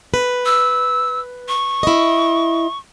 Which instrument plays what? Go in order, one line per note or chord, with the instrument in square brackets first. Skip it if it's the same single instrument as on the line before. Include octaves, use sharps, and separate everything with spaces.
[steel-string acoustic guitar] B4
[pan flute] E6
C#6
[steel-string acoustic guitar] E4 D#5